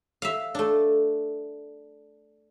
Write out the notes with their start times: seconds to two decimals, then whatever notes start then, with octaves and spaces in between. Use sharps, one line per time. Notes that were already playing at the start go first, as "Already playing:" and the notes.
0.22 E5 F5
0.55 A3 D4